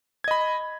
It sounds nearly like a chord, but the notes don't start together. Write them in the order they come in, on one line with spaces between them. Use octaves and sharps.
G#6 D#5 B5